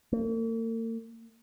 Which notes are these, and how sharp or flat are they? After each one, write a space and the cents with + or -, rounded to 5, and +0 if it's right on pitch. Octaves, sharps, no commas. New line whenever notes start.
A#3 -45